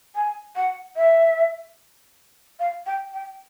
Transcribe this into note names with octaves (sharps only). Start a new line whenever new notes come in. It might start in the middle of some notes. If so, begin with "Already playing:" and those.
G#5
F#5
E5
F5
G5
G5